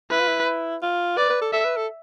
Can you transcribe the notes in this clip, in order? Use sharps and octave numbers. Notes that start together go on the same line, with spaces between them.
E4 B4
F4
E4
F4
B4 D5
B4
A4
A4 E5
B4
A4